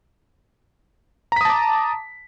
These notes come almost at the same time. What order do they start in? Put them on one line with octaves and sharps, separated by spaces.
A#5 B6 D#6 A5 D6